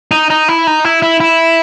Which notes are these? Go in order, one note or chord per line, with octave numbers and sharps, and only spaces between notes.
D#4
D#4
E4
D#4
E4
E4
E4